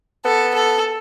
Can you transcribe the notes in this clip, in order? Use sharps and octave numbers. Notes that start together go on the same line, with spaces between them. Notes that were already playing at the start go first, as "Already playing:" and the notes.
B3 A4
A4